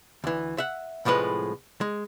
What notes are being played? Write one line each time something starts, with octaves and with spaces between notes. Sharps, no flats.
D2 E3
E5 F#5
C2 A2 F3 G#3 B4
G#3